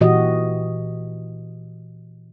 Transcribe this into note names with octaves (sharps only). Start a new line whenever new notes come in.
A#2 E3 F#4 G4 D#5